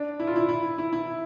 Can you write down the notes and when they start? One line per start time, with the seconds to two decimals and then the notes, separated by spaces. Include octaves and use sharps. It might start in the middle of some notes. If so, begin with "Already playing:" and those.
Already playing: D4
0.19 E4
0.27 F4
0.36 E4
0.49 E4
0.78 E4
0.92 E4